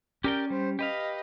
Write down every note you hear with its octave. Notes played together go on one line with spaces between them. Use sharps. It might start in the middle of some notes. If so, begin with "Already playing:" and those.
C#4 G4 A#4 D5 G5
G3 C5
G4 B4 D#5 F5